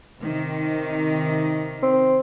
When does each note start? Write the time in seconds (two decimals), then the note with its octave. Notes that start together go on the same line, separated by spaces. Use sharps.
0.20 C3 D#3
1.83 C4